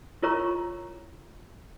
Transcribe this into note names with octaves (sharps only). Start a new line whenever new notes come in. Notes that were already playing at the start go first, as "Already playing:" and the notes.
E4 F4 A#4 C#5 A#5 C#6